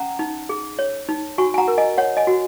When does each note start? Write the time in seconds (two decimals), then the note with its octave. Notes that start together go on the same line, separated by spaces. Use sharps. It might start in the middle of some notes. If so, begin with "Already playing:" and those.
Already playing: C#4 F#5 A#5
0.19 D#4
0.49 G#4
0.79 C#5
1.09 D#4
1.38 F#4 G#5 C#6
1.54 G#5
1.58 F#5 A#5
1.68 A#4
1.78 D#5 G#5
1.98 C#5 F#5
2.17 D#5 G#5
2.27 F#4